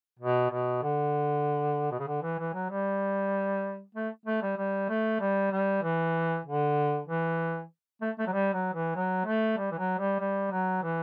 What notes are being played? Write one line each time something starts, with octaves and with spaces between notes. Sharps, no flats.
B2
B2
D3
B2
C#3
D3
E3
E3
F#3
G3
A3
A3
G3
G3
A3
G3
G3
E3
D3
E3
A3
A3
F#3
G3
F#3
E3
F#3
A3
G3
E3
F#3
G3
G3
F#3
E3